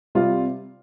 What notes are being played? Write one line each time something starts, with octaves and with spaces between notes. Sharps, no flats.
C3 G3 C4 F4